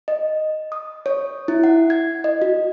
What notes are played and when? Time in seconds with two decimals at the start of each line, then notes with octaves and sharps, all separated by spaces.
0.08 D#5
0.72 D#6
1.06 C#5
1.48 E4
1.64 F#5
1.90 G#6
2.24 D#5
2.42 F#4